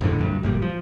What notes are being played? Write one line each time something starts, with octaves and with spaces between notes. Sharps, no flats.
A#1 F2 A2 D3
D1 A#1 G2
G1 A#2 D#3 G3
F3